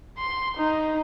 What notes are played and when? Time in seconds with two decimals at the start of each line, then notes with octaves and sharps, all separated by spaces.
0.18 C6
0.57 D#4